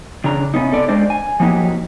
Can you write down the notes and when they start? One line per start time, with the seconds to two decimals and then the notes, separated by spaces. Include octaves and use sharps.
0.24 C#3 D4 A#5
0.54 C3 B3 C#4 D#4
0.72 A4 D5
0.88 G#3 D4 C5 D5
1.10 G#5
1.40 F3 F#3 A#3 D#4 G4